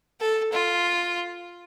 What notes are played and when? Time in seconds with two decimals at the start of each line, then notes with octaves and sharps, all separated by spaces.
0.20 A4
0.52 F4